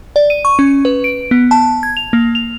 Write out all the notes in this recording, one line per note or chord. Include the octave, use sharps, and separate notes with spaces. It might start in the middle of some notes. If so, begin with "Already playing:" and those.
D5
D#7
C#6
C#4
B4
D7
B3
A5
G#6
F7
A#3
F7